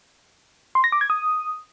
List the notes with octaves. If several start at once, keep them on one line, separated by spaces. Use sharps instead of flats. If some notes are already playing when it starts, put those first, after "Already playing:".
C6
A#6
D6
G#6
D#6